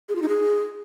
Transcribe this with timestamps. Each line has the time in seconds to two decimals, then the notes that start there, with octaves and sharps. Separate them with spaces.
0.09 G#4
0.15 F4
0.22 D#4
0.29 G#4